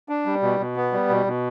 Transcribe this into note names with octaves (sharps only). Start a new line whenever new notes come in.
D4
G3
B2
B2
B3
G3
B2
B2